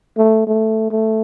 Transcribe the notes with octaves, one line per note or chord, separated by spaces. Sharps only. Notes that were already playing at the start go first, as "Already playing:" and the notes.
A3
A3
A3